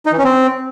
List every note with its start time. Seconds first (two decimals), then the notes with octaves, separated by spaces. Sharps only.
0.06 D#4
0.12 E3
0.18 C#4
0.24 C4